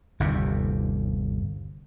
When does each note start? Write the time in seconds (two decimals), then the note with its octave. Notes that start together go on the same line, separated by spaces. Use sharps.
0.20 G1 D#2 C3